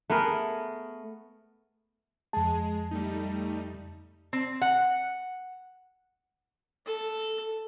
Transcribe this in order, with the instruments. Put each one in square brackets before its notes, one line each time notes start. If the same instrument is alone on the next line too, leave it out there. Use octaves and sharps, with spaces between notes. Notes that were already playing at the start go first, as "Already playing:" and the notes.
[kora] A3 B3 G#4 A#4
[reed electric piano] F2 A5 [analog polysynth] G#3 G#4
[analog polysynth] G3 A3 D#4
[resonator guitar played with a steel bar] C4
F#5
[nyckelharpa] A4